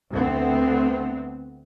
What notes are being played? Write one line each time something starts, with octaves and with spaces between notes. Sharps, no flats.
D2 D3 A3 B3 C4